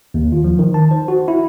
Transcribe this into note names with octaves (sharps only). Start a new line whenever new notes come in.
D#2
F4
F3
D#3
A5
C5
F#4
E4